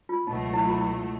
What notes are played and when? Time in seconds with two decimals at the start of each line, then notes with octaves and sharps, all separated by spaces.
0.09 F4
0.27 C#2 B2 F#3 A3 D#4
0.53 E4
0.66 F4
0.76 E4